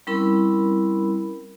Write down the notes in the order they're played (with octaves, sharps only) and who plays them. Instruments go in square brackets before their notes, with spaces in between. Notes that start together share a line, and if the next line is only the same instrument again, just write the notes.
[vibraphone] G3 C4 C#4 E4 A#4 B5